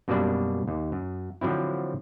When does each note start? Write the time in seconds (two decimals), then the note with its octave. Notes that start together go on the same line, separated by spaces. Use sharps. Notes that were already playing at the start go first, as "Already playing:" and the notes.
0.08 F#2 B2 G3 A#3 D4 D5
0.68 D#2
0.92 F#2
1.41 D3 F3 F#3 C4 E4